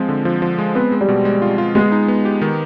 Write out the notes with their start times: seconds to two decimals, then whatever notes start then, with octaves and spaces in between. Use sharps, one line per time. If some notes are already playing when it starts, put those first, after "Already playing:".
Already playing: F3 G#3 C4
0.09 D3
0.25 F3
0.42 F3
0.59 G#3
0.75 B3 C4
0.92 G#3
1.01 G3
1.08 B2
1.25 G#3
1.42 F4
1.58 F4
1.75 G#3 B3
1.92 D#4
2.08 B3
2.25 G4
2.42 D#3